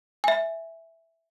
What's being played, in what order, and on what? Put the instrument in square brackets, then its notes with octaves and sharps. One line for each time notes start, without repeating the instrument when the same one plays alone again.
[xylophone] E5 G#5